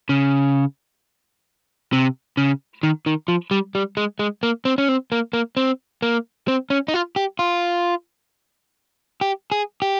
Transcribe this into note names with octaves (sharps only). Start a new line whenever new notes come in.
C#3
C3
C#3
D#3
D#3
F3
G3
G3
G#3
G#3
A#3
C4
C#4
C4
A#3
A#3
C4
A#3
C4
C#4
D#4
F4
G4
F4
G4
G#4
G4